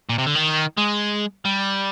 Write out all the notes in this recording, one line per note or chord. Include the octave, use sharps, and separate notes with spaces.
A#2
C3
D3
D#3
G#3
G3